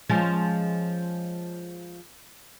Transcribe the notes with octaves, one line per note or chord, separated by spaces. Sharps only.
F3 G#3 C#4